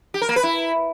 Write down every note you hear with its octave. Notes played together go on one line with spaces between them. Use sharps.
G4
A#4
A#3
B4
E4